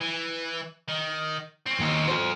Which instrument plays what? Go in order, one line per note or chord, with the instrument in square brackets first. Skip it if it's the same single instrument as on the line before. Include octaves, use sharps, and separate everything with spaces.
[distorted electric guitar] E3
D#3
C4 C#4
[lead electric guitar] D#2
A4 C5